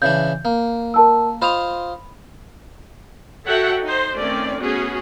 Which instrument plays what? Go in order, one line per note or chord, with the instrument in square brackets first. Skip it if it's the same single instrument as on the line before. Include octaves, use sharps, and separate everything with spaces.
[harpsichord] C#3 E3 D4 [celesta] G6
[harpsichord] A#3
[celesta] A#4 A5 E6
[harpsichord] F4 C5 D#5 [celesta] B5 F7
[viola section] F#4 A4 C#5 E5 F#5 G5
D#4 C5
D#3 A3 C4 C#4 D5
A3 B3 C#4 F#4 G#4